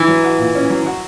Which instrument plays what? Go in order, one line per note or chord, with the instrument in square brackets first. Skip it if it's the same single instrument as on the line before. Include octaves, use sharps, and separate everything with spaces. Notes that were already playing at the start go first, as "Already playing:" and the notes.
Already playing: [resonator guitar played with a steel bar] E3
[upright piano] F#3
F#4
A#2
C#4
F#3
F#4